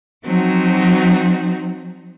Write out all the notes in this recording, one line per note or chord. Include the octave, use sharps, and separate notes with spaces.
F3 F#3 C4 D#4 F#4